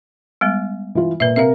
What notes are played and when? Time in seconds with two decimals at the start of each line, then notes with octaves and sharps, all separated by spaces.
0.41 G3 G#3 B3
0.95 E3 F4
1.20 A#2 B4 E5
1.36 C3 A#4 E5 F5